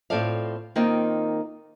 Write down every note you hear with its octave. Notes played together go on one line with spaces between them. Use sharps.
A2 C4 F4 A4 D5 F5
D#3 A#3 C4 D#4 F4